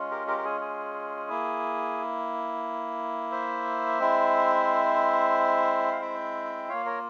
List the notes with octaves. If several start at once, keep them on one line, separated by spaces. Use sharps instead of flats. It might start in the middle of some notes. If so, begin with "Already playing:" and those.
Already playing: G#3 C#4 F4
G4 A#4
G4 A#4
A#4
G#4
G#4
A#3 E4
C5 E5
G#3 C4 E4
F5
E5 G5
A#3 F4 C#5 F5
A#4 C#5